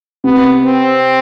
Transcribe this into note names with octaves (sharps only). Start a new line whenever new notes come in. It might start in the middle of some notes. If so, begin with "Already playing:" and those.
C3 B3
C4